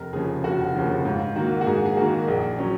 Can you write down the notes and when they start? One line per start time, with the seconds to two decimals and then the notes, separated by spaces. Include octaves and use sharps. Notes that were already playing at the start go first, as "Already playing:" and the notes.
Already playing: F1 A#4
0.13 D#2 C#3 F3 G#4
0.44 F1 F#4
0.75 D#2 C#3 F3
1.05 G#2 F4
1.36 D#3 A#3 F#4
1.61 F#4
1.66 G#2 G#4
1.86 G#4
1.96 D#3 A#3 F#4
2.28 A#1 G#4
2.59 F#3 C#4